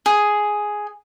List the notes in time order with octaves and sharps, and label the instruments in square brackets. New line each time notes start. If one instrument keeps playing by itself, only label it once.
[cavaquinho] G#4